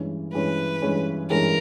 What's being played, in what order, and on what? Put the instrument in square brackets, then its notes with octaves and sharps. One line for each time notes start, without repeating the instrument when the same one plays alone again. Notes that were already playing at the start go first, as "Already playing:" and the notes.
Already playing: [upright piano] G2 E3 G#3 C#4
[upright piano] G2 E3 G#3 C#4 [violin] B4
[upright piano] G2 E3 G#3 C#4
[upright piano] G2 E3 G#3 C#4 [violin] A#4